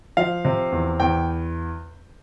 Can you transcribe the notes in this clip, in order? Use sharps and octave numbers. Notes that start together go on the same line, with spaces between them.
F3 F5
C3
E2
E2 G5